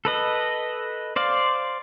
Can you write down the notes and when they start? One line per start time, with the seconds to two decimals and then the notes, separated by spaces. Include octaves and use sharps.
0.05 A4 B4 D#5
1.16 C5 D5 F5